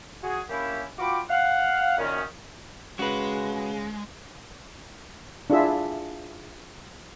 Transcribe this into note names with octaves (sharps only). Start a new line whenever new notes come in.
F#4 G#4
A#3 C#4 E4 G4
F4 F#4 G5 B5 D6
F5 F#5
F#2 A#2 D#3 C#4
C#3 G#3 F#4 B4
D4 E4 F4 G#4 E5